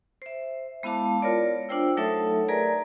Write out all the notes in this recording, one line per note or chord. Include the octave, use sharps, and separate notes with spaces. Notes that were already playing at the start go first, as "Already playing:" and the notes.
C5 E5
G#3 B3 E4 F5 A5 D6
F4 A#4 C#5 D5
D4 F4 C5 G5 E6
F#3 A3 D#4 A4 C#5 E5
G#4 A#4 B4 D5 G#5 A#5